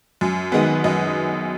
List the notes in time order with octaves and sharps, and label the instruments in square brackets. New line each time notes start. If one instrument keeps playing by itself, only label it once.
[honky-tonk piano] F#2
D#3 G#3 B3
F#2 D#5